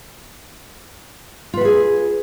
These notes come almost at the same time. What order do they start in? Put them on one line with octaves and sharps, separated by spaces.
F4 B4 F#4 G#4